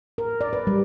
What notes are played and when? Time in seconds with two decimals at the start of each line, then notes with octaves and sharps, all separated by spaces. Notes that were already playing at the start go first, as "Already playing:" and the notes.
0.18 A#4
0.41 D5
0.53 B4
0.67 G3